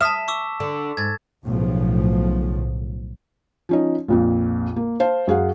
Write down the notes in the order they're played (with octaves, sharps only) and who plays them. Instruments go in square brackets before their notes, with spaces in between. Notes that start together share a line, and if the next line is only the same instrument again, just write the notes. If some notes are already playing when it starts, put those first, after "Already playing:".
[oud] E5 [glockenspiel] A5 B6 E7 [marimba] D#6 F6
[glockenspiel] C#6 D6 E6
[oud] D3
[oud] G#2 [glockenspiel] G#6 A6
[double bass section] B1 A2 C#3 F3
[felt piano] F3 C#4 D#4
A#1 F2 A#2
A#3
C5 F5 A5
F#2 G#4 F5 F#5